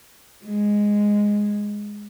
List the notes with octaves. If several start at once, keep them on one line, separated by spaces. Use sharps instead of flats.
G#3